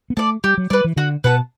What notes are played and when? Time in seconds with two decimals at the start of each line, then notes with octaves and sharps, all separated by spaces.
0.10 B3
0.17 A3 D5 A5
0.44 G3 G4
0.58 F#3
0.70 G3 B4 D5
0.84 E3
0.97 D3 F#4
1.24 B2 B4 F#5 A5